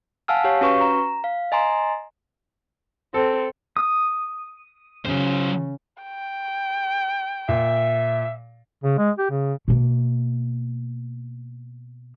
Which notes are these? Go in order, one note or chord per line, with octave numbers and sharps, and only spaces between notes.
F5 F#5 G#5 A5 E6 F6
G4 C#5 F5
C#4 F#4 B4 C#6
A#5
F5
D#5 G#5 A#5 C6
C4 A4
D#6
C#3 F#3 C5
G5
A#2 E5
C#3
G#3
G4
C#3
B2 A#3